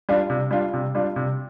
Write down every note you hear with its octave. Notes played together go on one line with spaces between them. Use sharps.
G3 D4 F4
C3
G3 D4 F4
C3
G3 D4 F4
C3